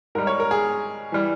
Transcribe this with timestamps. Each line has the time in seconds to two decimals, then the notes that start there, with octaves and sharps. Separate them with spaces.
0.15 G#2 G3 A#4
0.27 C#5
0.40 A#4
0.51 G#4
1.12 E3 G3